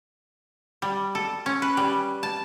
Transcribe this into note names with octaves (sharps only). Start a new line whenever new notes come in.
G3
A4
C#4
B4
G3
A5